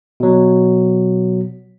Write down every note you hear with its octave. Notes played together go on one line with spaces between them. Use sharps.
B2 F#3